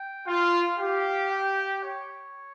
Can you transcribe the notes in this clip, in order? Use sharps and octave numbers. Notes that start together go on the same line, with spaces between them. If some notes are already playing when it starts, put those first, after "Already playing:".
Already playing: G5
F4 F5
G4 F5
G5
C#5